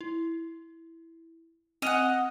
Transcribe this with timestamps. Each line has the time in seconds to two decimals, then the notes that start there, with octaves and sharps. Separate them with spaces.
0.01 E4
1.82 C4 D#5 F#5 F6 F7